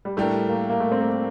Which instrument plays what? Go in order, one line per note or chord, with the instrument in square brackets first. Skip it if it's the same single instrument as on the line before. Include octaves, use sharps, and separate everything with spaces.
[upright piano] G3
[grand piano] A2 G3 D4 G4 A#4 [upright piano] A3
[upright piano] A#3
A#3
A3
C4
A#3